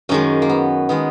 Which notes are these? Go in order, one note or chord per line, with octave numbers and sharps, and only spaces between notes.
F#2 D#3 G#3 C#4
A#3
B3
D#3 G#3 B3